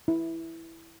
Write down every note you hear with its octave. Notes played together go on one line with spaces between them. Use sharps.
E4